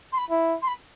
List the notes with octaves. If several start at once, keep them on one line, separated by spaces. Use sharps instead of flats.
C6
B5
E4
C6
B5